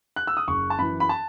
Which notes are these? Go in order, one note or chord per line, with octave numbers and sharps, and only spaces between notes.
F#6
E6
D#6
F#1 C#6
A5
F#2 E3 B5
B5
A5